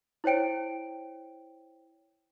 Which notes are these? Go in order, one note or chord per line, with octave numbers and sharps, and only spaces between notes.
E4 C5 C#5 G5 D7